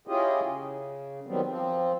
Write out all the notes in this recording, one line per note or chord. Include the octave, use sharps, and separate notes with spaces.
C#4 E4 F4 G4 G#4 D#5
C#3
D#3 F#3 G3 B3 C4
F3 C4